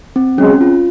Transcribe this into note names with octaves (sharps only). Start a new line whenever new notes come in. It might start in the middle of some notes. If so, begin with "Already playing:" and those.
C4
F#3 G#3 C#4
F4